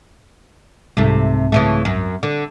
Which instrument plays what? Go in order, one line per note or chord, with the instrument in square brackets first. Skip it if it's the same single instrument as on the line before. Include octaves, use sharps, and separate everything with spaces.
[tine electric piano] C2 G#2 [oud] C3 A3
[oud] C#3 E3 A3
F#2
D3